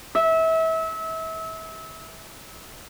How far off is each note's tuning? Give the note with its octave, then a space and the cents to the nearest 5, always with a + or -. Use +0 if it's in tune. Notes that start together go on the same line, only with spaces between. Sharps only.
E5 -30